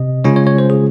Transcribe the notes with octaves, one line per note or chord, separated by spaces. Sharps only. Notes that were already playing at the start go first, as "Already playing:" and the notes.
Already playing: C3 D#5
C#3 G#3 C#4 F4 C#5
C#5
C#5
C5
G#4